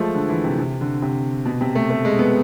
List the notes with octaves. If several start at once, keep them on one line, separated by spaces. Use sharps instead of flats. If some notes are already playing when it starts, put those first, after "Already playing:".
Already playing: F3 G#3 A3
D3
E3
C3
C3
D3
C3
B2
C3
A3
A3
G#3
B3